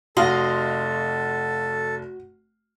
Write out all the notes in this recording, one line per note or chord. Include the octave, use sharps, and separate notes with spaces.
F1 F#4 A4 D#5 F5 C6